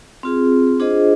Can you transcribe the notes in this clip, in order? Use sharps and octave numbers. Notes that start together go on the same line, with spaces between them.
C4 F4 G#4
D4 F4 G#4 C5 D#5